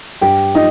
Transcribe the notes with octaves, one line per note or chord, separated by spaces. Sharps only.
G2 G4 G5
F3 D#4 D#5